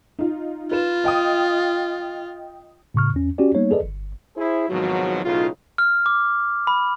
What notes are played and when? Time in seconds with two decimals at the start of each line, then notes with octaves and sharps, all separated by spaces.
0.19 D#4 F4
0.72 F4 B4 E7
1.04 D#5 G5 D#6
2.94 A2 C#3 C#6 F6
3.14 E2 C#4
3.38 C#4 F#4 G4 D5
3.55 G3 A#3 B3 D#4 C#5
3.71 G#4 A4 B4 D5 D#5
3.83 G1
4.37 E4 G#4 C5
4.69 G#1 G#2 B2 F3 F#3
5.24 B1 A2 C#3 D#4 F4
5.78 F6
6.06 D6
6.67 B5